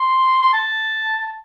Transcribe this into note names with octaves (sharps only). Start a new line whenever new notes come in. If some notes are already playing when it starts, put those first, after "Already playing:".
Already playing: C6
C6
A5